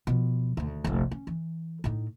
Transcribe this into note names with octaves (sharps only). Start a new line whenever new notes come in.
B2 F3
D2 D#3
F1 A#1
C#4
E3
A2 D#4